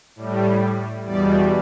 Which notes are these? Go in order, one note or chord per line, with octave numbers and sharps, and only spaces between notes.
A2 G3
E2 B2 G3 D5